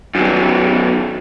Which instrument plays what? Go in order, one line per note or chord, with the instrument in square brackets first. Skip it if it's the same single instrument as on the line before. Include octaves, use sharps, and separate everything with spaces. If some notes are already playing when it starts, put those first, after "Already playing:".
[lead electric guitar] F#2 D#3